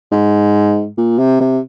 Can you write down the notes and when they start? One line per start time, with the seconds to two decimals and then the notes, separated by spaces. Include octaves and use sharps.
0.12 G#2
0.98 A#2
1.19 C3
1.40 C3